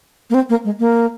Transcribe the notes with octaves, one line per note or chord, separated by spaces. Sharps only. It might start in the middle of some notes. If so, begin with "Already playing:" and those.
A#3
C4
A#3
G#3
A#3